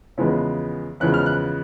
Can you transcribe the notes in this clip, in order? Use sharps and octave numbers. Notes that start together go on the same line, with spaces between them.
E2 C#3 F3 G#3 B3
E2 C#3 F3 G#3 B3 F#6
F6
F#6